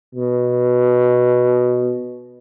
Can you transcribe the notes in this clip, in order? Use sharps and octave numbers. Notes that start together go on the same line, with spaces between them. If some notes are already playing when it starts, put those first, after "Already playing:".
B2